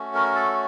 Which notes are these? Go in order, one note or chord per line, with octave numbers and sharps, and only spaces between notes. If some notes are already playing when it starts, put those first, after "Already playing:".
Already playing: A3 C#4 F#4
A#4
A4